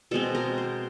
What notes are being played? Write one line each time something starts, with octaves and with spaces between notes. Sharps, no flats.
B2 G#3 C4 A4
A#4
C5